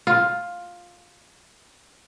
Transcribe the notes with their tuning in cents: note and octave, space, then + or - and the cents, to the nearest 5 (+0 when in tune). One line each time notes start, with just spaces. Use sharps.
F4 +10